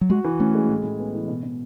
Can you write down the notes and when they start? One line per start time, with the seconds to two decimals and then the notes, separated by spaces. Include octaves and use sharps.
0.01 F#3
0.10 G#3 F#4
0.24 E3
0.40 A3 C#4
0.55 G#3
0.69 A2
0.84 A2
1.00 B3
1.14 E3
1.28 B2
1.43 B2